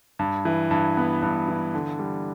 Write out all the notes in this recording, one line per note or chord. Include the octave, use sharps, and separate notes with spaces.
G2
E3
G2
B3
G2
E3
D3
G3